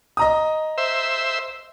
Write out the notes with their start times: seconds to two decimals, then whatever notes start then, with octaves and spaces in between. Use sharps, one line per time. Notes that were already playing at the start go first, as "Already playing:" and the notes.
0.17 D#5 A#5 D#6
0.78 C5 E5